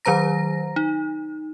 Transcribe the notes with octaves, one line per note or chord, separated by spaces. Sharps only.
D#3 F#3 C5 A#5 A#6
D#4